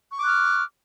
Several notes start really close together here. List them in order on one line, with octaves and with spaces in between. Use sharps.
C#6 D6 F#6 F6